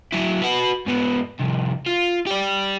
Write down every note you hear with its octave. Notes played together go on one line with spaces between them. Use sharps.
F#3 E4
F#4 B4
G#2 B3
C2 F2
F4
G4 D5